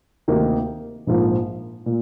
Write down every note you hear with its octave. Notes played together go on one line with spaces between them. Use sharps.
D2 C3 D#3 A#3 D#4
A#1 G#2 F3 A#3
A#2